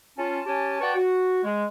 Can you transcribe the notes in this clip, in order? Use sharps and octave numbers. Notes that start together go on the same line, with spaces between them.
C#4 F4 A5
C#4 G4 G#5 A5
F#4 B4 D5 G5 A5 C#6
F#4
G#3